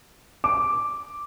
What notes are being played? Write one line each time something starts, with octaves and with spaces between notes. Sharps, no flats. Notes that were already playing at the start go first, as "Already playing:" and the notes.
D6